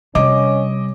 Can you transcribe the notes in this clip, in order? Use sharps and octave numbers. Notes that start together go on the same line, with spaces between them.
C3 G3 C#4 D#5 D6